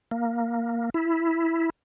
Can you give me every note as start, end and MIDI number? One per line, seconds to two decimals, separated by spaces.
0.11 0.90 58
0.94 1.70 64